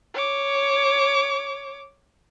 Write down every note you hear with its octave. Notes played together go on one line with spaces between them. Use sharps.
C#5 D6